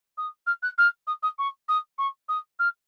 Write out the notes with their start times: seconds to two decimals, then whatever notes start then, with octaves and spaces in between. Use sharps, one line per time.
0.17 D#6
0.46 F6
0.62 F#6
0.78 F6
1.07 D#6
1.22 D#6
1.38 C#6
1.68 D#6
1.98 C#6
2.28 D#6
2.59 F6